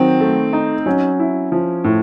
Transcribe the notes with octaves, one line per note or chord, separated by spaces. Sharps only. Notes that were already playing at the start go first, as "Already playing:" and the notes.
Already playing: D#3 F#3 C4
A3
D#4
F#3 C#4
E4
F3
A2